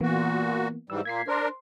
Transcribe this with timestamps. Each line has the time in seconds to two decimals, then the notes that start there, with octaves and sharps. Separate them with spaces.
0.01 A#2 E3 A#3 B3 F#4
0.90 G#2 E3 G3 E6
1.05 A#2 A#3 G#6 B6 C7
1.28 D4 A#4 C5 C6